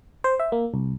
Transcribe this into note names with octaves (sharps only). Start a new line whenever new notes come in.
C5
E5
A#3
C2